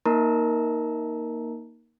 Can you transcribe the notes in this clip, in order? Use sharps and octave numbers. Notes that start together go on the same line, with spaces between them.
A#3 D#4 A#4 A#5